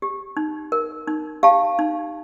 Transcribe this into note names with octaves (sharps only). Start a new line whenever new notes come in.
G4
D#4
A#4
D#4
G4 F5 A5
D#4